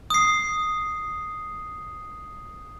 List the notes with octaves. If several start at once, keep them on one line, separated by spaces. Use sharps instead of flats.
D#6 C7